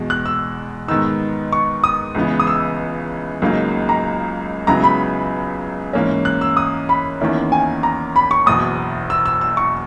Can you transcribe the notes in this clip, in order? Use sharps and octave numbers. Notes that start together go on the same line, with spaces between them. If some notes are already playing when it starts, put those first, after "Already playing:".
Already playing: E2 B2 G#3
F#6
E6
G#2 D#3 G#3 B3 D#4 E6
C#6
D#6
C#2 C#3 E3 B3
D#6
E6
C#2 C#3 F#3 A#3 D#4
A#5
C#2 C#3 F#3 B3 E4 A#5
B5
G#2 E3 A#3 C#4
F#6
E6
D#6
B5
E2 D#3 A#3 C#4 E4
G#5
A#5
B5
C#6
F#1 E2 B2 D#6
E6
E6
E6
C#6